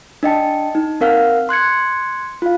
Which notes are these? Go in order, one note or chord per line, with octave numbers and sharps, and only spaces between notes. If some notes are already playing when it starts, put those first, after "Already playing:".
D4 D#5 G5 A5
D#4
C4 A#4 F5 F#5 F6
C6 F#6 G#6 C#7
F4 F5